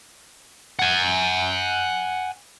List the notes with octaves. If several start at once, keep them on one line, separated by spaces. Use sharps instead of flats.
F#5 G#5